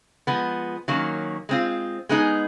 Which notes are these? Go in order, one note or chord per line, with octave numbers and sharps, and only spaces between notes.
F3 G#3 B3
D#3 F#3 A#3 C#4
G#3 C4 F4
G#3 B3 D#4 G#4